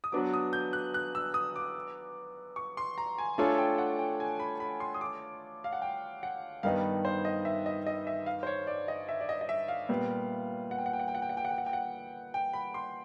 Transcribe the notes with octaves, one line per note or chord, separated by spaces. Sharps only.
D#6
F#3 B3 D4 F#4 B4 D6
D#6
G6
F#6
F#6
E6
D#6
D6
C#6
C6
A#5
G#5
A3 D4 F4 A4 C#5 G#5
G5
F#5
G5
G#5
B5
B5
C6
D#6
D6
F5
F#5
G5
F#5
G2 D#3 G3 B3 D#4 F5
C5
D#5
E5
D#5
D#5
E5
F5
C5
C#5
D5
D#5
E5
D5
D#5
D#5
E5
F5
A#2 G3 B3
F#5
G5
F#5
G5
F#5
G5
F#5
G5
F#5
G5
F#5
G5
F#5
G5
F#5
G5
B5
C6